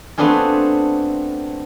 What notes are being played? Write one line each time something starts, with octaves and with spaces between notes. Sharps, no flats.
A3 B3 C4 D4 F4 G#4